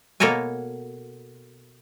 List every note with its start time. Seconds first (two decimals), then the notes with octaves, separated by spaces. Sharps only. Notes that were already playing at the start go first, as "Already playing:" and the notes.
0.20 B2 A#3 A4 A#4 C#5 G#5